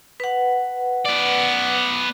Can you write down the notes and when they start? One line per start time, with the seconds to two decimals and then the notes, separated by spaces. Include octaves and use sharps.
0.20 B4 F#5
1.06 B3 D5